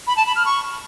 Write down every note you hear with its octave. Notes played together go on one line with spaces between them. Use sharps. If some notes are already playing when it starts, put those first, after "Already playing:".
B5
A5
B5
F6
C#6